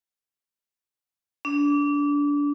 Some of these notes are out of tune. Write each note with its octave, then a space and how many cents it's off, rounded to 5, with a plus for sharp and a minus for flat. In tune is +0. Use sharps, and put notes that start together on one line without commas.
D4 -25